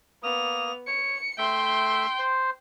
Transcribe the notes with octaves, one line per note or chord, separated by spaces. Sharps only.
A#3 B3 D#6 F7
C#5 C#7
A3 E5 G5 C6
C5